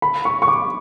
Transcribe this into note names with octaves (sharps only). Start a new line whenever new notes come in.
B5
C#6
C#6
D6